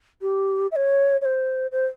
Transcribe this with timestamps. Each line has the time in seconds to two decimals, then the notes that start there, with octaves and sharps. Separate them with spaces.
0.21 G4
0.71 E5
0.76 C#5
1.21 C#5
1.25 C5
1.72 C5